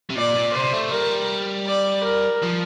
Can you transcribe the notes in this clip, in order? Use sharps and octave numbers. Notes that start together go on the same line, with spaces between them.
C3
A#2 D5
A#2
C3 C5
A3
G3 A#4
D5
A#4
F3